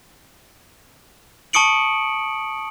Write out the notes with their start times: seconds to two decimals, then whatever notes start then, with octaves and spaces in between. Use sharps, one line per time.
1.53 A5 C#6 D#6 C#7 D7 F#7